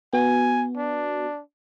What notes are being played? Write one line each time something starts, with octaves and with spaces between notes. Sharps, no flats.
B3 F#4 G#5
D4